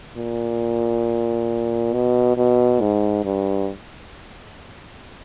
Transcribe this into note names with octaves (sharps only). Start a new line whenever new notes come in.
A#2
B2
B2
G#2
G2